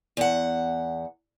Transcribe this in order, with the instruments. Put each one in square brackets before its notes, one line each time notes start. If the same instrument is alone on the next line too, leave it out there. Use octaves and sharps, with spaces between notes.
[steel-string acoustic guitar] E2 F#5